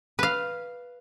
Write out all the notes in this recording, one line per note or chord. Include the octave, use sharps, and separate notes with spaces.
B4 F5